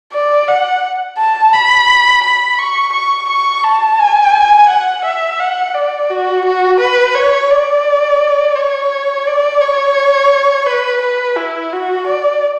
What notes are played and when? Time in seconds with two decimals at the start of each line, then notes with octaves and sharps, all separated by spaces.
0.13 D5
0.48 F#5
1.18 A5
1.53 B5
2.24 B5
2.59 C#6
2.93 C#6
3.29 C#6
3.64 A5
3.99 G#5
4.69 F#5
5.05 E5
5.39 F#5
5.75 D5
6.10 F#4
6.45 F#4
6.80 B4
7.15 C#5
7.50 D5
8.56 C#5
9.27 D5
9.61 C#5
10.66 B4
11.02 B4
11.37 E4
11.73 F#4
12.07 D5